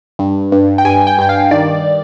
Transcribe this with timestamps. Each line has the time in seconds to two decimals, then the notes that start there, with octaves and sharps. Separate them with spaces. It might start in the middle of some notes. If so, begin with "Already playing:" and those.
0.19 G2
0.52 G2
0.78 G5
0.85 G2 G#5
1.07 G5
1.18 G2 G5
1.29 F5
1.51 D#3 D5